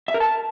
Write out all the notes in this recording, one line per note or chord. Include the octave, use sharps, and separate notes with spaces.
E5
A#4
A5